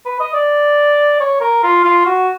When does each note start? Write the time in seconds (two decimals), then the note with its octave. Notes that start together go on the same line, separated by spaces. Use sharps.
0.05 B4
0.20 D#5
0.34 D5
1.20 C#5
1.41 A#4
1.63 F4
1.84 F4
2.06 F#4